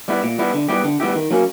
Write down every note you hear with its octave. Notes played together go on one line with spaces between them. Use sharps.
G3 B3 E4
A#2
G3 B3 E4
D3
G3 B3 E4 G4
D3
G3 B3 E4 G4
D#3
F#3 A#3 C#4